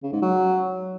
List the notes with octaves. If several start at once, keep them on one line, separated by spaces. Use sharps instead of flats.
C#3
G#2
F#3